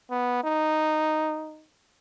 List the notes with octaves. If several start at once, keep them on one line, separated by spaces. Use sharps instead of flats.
B3
D#4